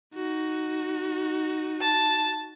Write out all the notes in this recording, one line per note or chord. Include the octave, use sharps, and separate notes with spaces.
D#4 F#4
A5